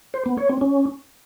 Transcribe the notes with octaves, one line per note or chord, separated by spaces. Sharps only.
C5
B3
C#5
C4
C#4